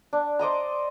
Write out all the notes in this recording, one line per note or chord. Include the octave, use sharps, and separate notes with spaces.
D4
C5 D5 D#5 A#5